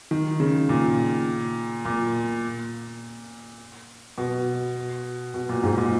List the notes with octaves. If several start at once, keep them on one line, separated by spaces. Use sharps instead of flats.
D#3
C#3
A#2
A#2
B2
B2
A#2
G#2
A#2